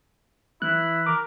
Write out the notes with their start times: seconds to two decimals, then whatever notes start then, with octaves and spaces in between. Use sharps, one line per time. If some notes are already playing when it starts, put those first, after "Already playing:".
0.62 E3 E4 F#6
1.06 A#4 D6